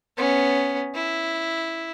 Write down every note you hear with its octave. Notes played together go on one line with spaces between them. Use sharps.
B3 C#4
E4